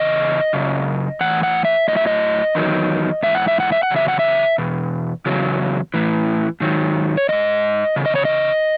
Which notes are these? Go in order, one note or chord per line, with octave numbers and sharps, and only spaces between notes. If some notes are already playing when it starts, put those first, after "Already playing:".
Already playing: E2 C#3 D#5
F#2 C#3
A2 E3 F#5
F#5
E5
A2 F#3 D#5
E5
D#5
E2 D#3 F#3
G#2 E3 E5
F#5
E5
F#5
E5
F#5
E2 C#3 F#3
E5
F#5
E5
E2 B2
E2 C#3 F#3
A2 E3
G#2 D#3 F#3
C#5
G#2 E3 D#5
E2 C#3
D#5
C#5
D#5